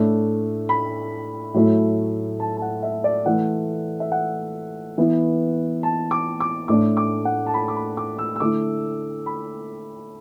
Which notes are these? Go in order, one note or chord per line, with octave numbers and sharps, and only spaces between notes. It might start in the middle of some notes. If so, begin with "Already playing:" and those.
Already playing: A2 A3 D4
B5
A2 F#3 A3 E4
A5
A5
F#5
E5
D5
E3 A3 E4 F#5
E5
F#5
E3 B3 E4
A5
D6
D6
A2 A3 D4 D6
D6
F#5
A5
B5
D6
B5
D6
E6
E6
D3 A3 E4 D6
B5